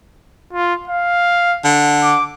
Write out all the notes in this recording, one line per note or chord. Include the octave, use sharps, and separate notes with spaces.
F4
F5
D3
D6